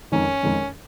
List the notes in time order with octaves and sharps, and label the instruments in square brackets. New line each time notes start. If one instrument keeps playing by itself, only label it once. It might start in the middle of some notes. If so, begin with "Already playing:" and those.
[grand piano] F2 D#3 G#3 D#4 A#4 [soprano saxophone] C#4
[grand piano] F2 D#3 G#3 D#4 A#4